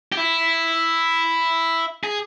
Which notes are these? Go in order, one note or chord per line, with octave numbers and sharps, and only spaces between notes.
G4
E4
G#4